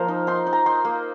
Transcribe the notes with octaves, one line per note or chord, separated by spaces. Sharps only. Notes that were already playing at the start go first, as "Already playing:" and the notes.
Already playing: F3 A#3 F4 A#4 C5 A#5
D#4
D#4 C6
D#4
A#5
D#4 C6
A#3